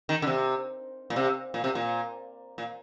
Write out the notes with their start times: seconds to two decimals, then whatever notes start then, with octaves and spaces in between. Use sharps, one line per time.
0.09 D#3
0.22 D3
0.27 C3
1.10 A#2
1.16 C3
1.54 A#2
1.64 C3
1.75 A#2
2.58 A#2